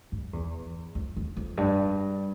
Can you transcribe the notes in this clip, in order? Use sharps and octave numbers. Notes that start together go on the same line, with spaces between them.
G2
E2
F2
E2
F2
G2